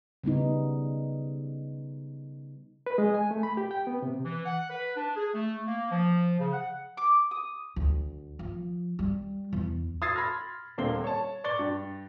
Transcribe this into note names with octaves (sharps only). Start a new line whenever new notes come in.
C#3 G3 B3 D#4
B4
G#3
G#5
A3
B5
G4
G5
B3
C3
E3
F#5
B4
D4
G#4
A3
A#3
F3
C#3
F#5
D6
D#6
D2
F3
G3
E2
D#6 E6 G#6 A6 C7
B5 C6 F6 A#6
D#1 D3 A#3 C4 C7 G7
C#5 A5
D5 C#6 A6 G7
G2